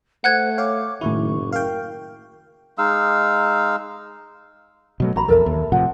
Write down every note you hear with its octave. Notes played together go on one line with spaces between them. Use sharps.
A3 C5 F#5 F#6 G#6
C#5 F5 G5 D6
F#1 A2 D#3 E4 C#6
A#4 F5 G5
G#3 D#4 F5 E6
B2 F#3 A3
A1 F#4 A#5 B5
A#1 E2 A4 A#4 E5
D#2
A2 C3 F3 F#5